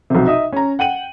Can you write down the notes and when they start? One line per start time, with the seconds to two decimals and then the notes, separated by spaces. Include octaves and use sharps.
0.10 B1 C3
0.27 D#4 E5 D#6
0.52 C#4 A#5
0.79 F#5 G5 D#7 F#7